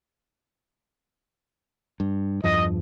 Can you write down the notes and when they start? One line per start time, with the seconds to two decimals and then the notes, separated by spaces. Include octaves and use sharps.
2.00 G2
2.44 E2 G2 F3 D#5